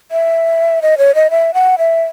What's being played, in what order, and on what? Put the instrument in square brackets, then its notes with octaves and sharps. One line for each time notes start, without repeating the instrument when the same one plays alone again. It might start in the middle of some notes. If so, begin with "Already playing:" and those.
[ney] E5
D#5
C#5
D#5
E5
F#5
E5